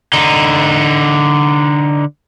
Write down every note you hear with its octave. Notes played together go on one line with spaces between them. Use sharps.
D3 D#4